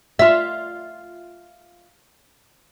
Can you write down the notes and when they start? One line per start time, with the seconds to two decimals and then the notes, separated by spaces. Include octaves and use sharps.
0.19 F4 E5